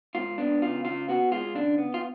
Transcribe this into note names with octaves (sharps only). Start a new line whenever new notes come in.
G#2 F4
B3 D4
C#3 F4
C#3 F4
B3 F#4
G#3 F4
C#3 D4
B3
F4